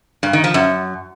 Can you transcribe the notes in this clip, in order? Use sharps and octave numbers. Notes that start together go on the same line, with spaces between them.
G2
D#3
F3
F#2